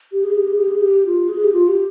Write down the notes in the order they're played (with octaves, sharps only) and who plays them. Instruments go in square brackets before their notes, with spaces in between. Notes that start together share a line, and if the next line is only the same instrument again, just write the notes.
[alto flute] G4
G#4
G4
G#4
G4
G#4
G4
F4
G#4
G4
F4
G4